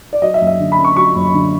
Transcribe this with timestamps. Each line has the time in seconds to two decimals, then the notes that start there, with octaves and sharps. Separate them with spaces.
0.13 D5
0.22 F#3 D#5
0.34 E5
0.41 F#1
0.47 E5
0.59 D3
0.72 B5
0.78 F#2
0.85 C#6
0.96 F#3 C#6
1.16 F#1
1.34 D3